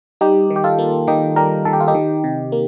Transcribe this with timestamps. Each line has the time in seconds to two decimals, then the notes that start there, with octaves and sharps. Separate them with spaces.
0.21 G3 D#4 G4
0.50 D#3
0.56 G4
0.64 F4 A4
0.79 A#3
1.07 D#3 D#4 G4
1.36 G3 G4 A#4
1.65 D#3 A4
1.73 G4
1.80 F4
1.88 D#4 G4
1.95 D#3
2.24 C3
2.52 A#3